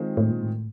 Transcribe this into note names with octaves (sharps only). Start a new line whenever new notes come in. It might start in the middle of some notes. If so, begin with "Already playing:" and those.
Already playing: D#3 G#3 C4 F4
A2
A#2
A2